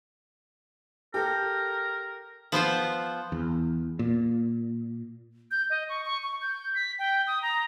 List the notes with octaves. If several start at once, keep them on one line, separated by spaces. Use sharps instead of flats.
G4 A4 A#4
F3 B3 F4 C5
E2
A#2
G6
D#5
C#6
C#6
C#6
G6
B6
G5
D#6
A#5